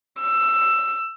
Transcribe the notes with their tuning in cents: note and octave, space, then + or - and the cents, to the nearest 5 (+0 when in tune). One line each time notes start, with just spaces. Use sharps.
E6 +15